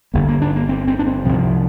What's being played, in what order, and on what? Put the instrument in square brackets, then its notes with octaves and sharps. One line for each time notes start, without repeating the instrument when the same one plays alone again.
[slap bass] G1 G2 D3 A#3
A#3
D4
A#3
C4
C4
D4
C4
C2 C3 F3